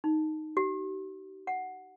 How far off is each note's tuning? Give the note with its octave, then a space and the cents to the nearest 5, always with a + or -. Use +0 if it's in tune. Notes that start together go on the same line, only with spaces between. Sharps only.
D#4 +0
G4 -45
F#5 +0